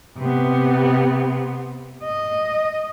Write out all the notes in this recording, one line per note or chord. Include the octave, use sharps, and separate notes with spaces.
C3 B3
D#5